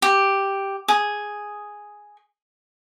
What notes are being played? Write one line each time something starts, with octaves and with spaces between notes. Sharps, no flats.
G4
G#4